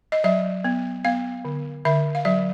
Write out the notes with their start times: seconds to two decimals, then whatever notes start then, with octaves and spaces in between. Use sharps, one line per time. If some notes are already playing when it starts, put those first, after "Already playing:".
0.12 D#5
0.24 F#3 E5
0.64 B3
1.05 B3 F5
1.45 D3
1.85 D3 E5
2.15 F5
2.25 F#3 E5